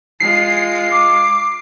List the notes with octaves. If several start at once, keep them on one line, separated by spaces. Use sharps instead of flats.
G#3 F4 C7
D6